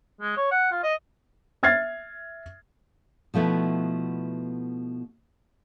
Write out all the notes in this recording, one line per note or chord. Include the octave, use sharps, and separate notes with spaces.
G#3
C#5
F#5
F4
D#5
E5 F6 G#6 A6 C7
B2 F3 A3 B3 E4